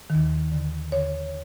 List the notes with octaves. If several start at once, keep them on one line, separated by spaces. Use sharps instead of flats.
D#2 D#3
D#2 D3
D#2 D3 C#5